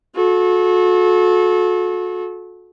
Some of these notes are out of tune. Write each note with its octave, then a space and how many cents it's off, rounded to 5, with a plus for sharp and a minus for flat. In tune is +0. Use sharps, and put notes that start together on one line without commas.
F#4 -35 A4 -25